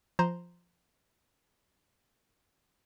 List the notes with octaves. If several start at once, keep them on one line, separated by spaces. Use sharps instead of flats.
F3 C5 A#5 C6